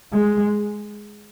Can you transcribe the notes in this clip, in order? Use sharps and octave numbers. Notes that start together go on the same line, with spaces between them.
G#3